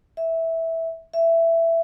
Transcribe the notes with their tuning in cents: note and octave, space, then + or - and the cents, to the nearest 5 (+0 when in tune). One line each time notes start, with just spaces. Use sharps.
E5 -10
E5 +10